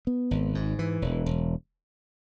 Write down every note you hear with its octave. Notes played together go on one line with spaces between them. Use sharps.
B3
G#1
G#2
E3
E1
E1